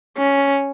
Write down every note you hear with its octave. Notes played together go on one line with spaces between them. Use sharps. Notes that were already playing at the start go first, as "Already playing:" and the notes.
C#4